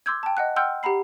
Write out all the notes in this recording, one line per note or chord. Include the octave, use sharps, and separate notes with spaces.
C6 D6 E6 G6 G#6
G5 A5
D#5 F#5 F#6
F#5 G5 C6 E6 F6 G6
G4 F#5 A#5 B5 C7